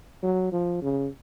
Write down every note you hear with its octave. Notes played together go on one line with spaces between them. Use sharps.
F#3
F3
C#3